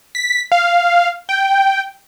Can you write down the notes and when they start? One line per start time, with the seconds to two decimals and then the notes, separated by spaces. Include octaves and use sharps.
0.15 B6
0.52 F5
1.29 G5